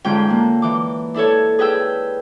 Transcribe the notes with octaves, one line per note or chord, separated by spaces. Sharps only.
G#2 D3 G#3 C#4 F4 G5
D3 A#3
E3 D6
D4 E4 A4 C#5
G#4 B4 G5 E6